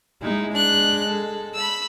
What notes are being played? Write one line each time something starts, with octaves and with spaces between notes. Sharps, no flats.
G#3 D#4 E4
D4 F#6
A4
B5 E6